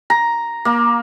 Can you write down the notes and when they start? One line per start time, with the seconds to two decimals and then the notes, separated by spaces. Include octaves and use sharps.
0.10 A#5
0.65 A#3